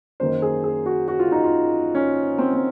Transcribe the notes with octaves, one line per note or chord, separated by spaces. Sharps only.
F#2 D#3 A#3 C5
G#4
G#4
F#4
F#4
F4
D#4
F4
C#4
C4
C4